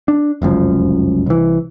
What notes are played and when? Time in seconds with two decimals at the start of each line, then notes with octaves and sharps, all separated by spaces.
0.08 D4
0.42 F1 C#2 F#2 F3
1.26 C2 E3